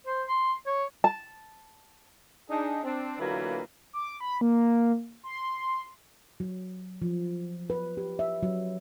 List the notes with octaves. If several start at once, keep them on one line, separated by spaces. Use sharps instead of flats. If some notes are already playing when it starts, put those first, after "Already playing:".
C5
C6
C#5
A5
D4 D#4 G#4
C4 D4
A#2 D3 E3 F#3 A#3 B3
D6
B5
A#3
C6
F#3
F3
B4
G4
E5
F#3